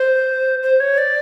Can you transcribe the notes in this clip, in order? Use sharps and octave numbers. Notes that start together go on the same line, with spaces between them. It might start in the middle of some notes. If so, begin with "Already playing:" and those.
Already playing: C5
C5
C#5
D5